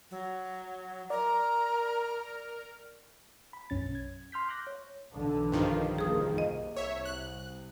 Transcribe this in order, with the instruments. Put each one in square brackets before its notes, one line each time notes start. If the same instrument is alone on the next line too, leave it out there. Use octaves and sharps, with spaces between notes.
[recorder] F#3
[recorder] A#4 [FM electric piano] D5 [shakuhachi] A#5
[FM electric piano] B5
B1 F#2 C#4 A6
G#6
C6 F6 G6 B6
D6 F#6 G6 A#6
C#5
[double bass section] B1 D3 E3
[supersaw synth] G2 D#3 F3
[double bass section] F1 A#3 [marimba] G#4 D#6
[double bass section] C2 [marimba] D#5
[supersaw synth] C#5 E5
F#6